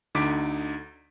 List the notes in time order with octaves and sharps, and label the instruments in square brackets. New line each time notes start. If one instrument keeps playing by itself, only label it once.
[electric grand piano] D2 D3 D#4 D6 B6 D7